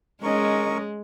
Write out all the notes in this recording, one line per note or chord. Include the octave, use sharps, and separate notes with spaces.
G#3 C#4 A#4 D#5 C#6